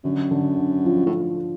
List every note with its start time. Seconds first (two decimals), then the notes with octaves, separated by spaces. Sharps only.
0.04 F#2 D3
0.31 D3
0.58 D4
0.85 F3
1.06 A2